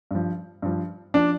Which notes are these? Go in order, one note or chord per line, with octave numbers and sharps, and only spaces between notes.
G2 F3
G2 F3
F3 D4